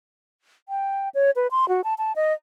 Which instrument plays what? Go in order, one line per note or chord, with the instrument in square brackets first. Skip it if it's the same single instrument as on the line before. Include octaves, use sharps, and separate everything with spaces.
[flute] G5
C#5
B4
C6
F#4
A5
A5
D#5